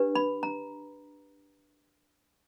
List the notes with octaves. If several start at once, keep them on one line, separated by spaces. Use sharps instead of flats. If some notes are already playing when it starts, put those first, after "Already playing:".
Already playing: D4 G4 B4
B5
A#5